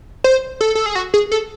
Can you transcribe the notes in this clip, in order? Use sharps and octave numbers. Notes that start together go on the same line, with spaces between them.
C5
A4
A4
G#4
F#4
G#4
A4